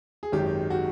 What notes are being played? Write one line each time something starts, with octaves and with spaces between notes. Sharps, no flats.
G#4
G#1 F#2 D#3 G#3 G4
F#4